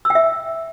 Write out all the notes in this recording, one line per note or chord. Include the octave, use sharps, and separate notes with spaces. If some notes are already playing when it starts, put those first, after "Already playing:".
E6
G5
E5